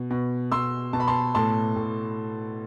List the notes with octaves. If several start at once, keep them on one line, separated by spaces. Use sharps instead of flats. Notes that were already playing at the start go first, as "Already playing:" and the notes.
Already playing: B2
B2
B2 C6 E6
B2 A5
B5
A5 C6
A2 A5 C6
A2